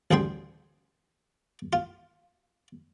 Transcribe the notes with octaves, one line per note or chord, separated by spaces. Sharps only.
A1 D2 G3 G#4 G5 C6
F4